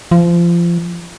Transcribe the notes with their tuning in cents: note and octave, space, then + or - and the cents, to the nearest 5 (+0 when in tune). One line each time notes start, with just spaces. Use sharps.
F3 -25